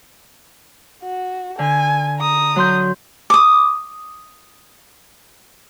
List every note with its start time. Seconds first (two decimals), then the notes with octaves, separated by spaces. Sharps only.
1.03 F#4
1.59 D3 G#5
2.20 A#5 D#6
2.56 F#3 C6 G6
3.30 D6 D#6